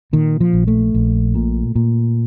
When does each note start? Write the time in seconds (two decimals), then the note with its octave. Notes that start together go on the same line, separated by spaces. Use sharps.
0.13 A#2 D#3
0.41 F3
0.53 A#1
0.67 A3
0.94 A#1
1.35 A#2
1.76 A#2